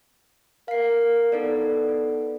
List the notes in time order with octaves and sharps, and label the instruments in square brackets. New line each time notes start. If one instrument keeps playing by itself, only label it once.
[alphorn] A#4 [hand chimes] F5 C7
[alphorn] B3 [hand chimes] D#4 A4 D5